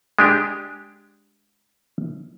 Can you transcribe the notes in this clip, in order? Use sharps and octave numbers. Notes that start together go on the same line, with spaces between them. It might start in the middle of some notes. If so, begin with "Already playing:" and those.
G#3 D4 G4